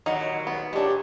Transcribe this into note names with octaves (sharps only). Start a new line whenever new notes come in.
D#2 A#2 F#3 D#4 F#5
B3
A#2 G#3 D4 G4 C#5